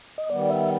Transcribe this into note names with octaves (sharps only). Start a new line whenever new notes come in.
D#5
D#3 G3 B3 D5
E5